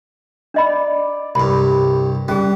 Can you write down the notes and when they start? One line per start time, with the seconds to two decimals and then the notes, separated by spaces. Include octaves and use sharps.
0.54 D4 D5 D#5 B5
1.35 C2 G2 G4 B5
2.28 C#3 G3 C#4 G#4